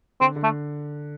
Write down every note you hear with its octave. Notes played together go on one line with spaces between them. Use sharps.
D3 C4
D3
A3